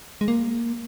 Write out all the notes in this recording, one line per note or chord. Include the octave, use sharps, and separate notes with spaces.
G#3
A#3